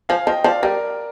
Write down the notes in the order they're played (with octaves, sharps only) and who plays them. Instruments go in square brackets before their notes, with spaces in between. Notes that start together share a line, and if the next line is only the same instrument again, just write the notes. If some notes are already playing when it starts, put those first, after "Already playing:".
[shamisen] F3 [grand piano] F5 G#5
[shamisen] F3 [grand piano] D#5 G5
[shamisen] F3 [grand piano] D5 F5
[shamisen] G3 [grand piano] A#4 D5